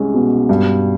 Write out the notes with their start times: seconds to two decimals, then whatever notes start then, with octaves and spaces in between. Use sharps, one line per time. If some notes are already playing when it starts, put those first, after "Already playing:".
Already playing: C2 G#3 C#4
0.14 B2
0.49 G2